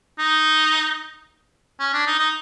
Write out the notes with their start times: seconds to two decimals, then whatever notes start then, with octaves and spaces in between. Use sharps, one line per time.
0.19 D#4
1.80 C#4
1.93 D4
2.06 D#4
2.19 D#4